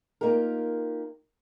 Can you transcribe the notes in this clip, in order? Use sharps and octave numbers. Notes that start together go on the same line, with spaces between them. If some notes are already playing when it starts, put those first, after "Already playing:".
A#3 D#4 F4 G4 A#4